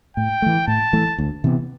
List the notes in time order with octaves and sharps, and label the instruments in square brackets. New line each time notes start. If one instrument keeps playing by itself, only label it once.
[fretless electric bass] A2 [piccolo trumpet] G5
[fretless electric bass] E3 A3
[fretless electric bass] A2 [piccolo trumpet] A5
[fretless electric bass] E3 A3
D2
C3 E3 B3